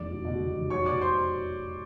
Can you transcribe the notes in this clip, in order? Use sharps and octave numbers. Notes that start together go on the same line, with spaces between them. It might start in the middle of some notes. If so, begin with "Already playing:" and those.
Already playing: F1 E2 D5
F#3
B2
E2
F1
F#3 C#5 C#6
B2 D5 D6
C5 C6